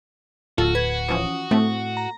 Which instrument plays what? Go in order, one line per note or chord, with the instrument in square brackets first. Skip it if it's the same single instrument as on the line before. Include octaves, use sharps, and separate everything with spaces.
[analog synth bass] D1 [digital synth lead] F4 [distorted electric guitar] F#4 [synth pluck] A4
[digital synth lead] B4 [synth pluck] G#6
[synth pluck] E3 F3 C#4 [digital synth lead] D#6
[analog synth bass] A2 [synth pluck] A3 C4
[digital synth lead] A#5